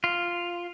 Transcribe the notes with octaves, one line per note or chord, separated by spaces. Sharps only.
F4